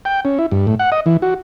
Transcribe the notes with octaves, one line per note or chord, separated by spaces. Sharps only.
G5
C#4
E4
G2
A2
F#5
D#5
E3
F#4